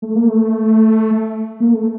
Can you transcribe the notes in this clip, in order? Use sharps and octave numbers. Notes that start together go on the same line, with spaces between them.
A3
A#3
A3
A#3
A3